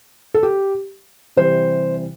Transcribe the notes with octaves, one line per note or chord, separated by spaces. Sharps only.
A4
G4
C3 E3 G3 C5